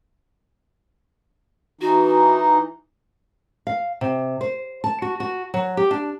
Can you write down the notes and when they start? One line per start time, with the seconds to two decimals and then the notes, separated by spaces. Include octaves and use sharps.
1.81 E3 D#4 F#4
3.67 F5
4.01 C3
4.41 C5
4.84 A5
5.02 F#4
5.20 F#4
5.54 F#3
5.77 G4
5.91 D4